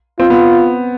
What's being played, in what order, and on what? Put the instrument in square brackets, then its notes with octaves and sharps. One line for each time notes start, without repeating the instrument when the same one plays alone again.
[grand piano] C4 [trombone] F4
[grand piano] B3